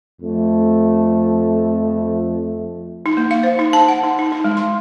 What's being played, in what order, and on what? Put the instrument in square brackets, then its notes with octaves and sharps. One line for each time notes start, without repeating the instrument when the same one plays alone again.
[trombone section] F2 A3
[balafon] D#4
A#3
F5
C5
D#4
A5
F#5
D#4
D#4
D#4
G#3
C6